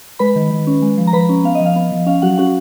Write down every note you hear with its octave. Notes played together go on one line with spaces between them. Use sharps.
G#3 B4 B5
D#3
D#3
C#4
G#3
F3
A#5
F3 B4 B5
C#4
B3 F5
D#5
F3
F5
B3
F3
C#4 F5
F#3 F#4 F#5
C#4 F#4 F#5